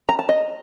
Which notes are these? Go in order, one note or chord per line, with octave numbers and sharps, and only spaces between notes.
A#5
A5
D#5